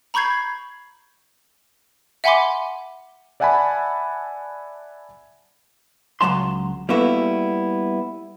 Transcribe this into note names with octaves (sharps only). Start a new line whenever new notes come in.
A#5 B5 C#6 G6 G#6 C7
E5 F#5 G#5 B5 C6 D6
D5 E5 F#5 G#5 A5 B5
C#2 G2 F#3 A5 C6
G3 A#3 B3 E4 F#4 A4